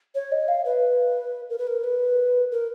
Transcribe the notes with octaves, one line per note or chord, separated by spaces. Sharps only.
C#5
D#5
F5
B4
A#4
B4
A#4
B4
A#4